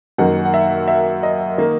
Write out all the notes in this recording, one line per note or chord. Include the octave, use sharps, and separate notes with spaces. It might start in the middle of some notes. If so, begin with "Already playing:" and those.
F#2 D#3 A#3 F#5
F#5
E5
E5
D#5
D#3 A#3